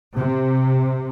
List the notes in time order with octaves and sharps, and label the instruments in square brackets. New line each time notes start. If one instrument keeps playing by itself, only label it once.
[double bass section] C3